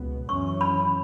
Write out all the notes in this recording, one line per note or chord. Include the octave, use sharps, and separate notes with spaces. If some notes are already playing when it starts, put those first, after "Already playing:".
Already playing: C#2 B2 B3
F#2 E3 C#4 C#6
B5